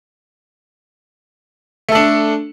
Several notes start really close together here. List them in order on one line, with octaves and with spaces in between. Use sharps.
A3 A4 D4